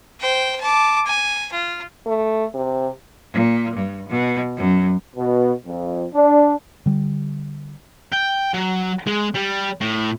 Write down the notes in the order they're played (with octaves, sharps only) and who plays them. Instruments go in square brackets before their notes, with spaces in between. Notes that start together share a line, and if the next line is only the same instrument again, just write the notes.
[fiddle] C5 G5
A5 D6
G#5
F4
[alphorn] A3
C3
[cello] A#2
G2
B2
F#2
[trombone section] B2
F2
D4
[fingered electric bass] D3 G3
[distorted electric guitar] G5
F#3
G#3
G3
A2